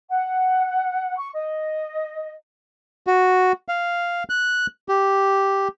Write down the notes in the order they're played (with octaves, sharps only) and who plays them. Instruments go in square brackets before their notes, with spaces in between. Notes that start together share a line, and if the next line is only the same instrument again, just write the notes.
[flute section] F#5
C#6
D#5
[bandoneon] F#4
F5
F#6
G4